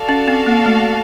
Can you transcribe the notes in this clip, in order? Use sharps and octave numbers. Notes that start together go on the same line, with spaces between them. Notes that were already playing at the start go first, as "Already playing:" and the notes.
Already playing: F#4 A4 D5 F5 A5
C#4
C4
A#3
A3